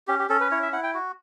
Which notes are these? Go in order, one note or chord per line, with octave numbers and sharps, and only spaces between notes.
C#4 G4
G4
C#4 A4
B4
E4 C#5
E5
E4 F#5
G5
F#4